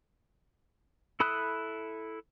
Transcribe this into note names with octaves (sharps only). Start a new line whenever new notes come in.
E4 A4 B5 D#6 F#6